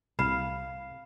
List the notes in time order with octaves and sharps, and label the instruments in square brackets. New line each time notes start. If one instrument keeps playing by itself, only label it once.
[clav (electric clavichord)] C2 [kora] F5 [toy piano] B5